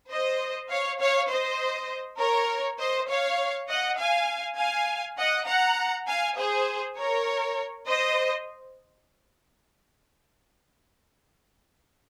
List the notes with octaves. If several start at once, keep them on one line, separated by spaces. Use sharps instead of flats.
C5 D#5
C#5 F5
C#5 F5
C5 D#5
A#4 C#5
C5 D#5
C#5 F5
D#5 F#5
F5 G#5
F5 G#5
D#5 F#5
F#5 A#5
F5 G#5
G#4 C5
A#4 C#5
C5 D#5